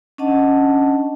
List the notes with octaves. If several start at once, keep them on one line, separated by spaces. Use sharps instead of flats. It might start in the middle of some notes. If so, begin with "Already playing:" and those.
C#4 D4 D#5 F#5 A5